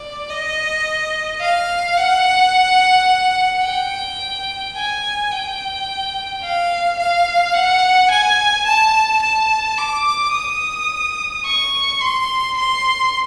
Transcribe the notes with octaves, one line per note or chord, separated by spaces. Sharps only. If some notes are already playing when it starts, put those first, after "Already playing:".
Already playing: D5
D#5
F5
F#5
G5
G#5
G5
F5
F5
F#5
G#5
A5
A5
D6
D#6
C#6
C6
C6